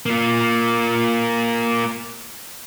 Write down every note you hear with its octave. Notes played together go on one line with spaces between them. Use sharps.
A#3 F4